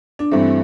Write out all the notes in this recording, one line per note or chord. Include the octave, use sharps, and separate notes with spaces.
D4
G2 E3 A3 C4